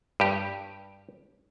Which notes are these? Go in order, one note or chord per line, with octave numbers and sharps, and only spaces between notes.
G2 G4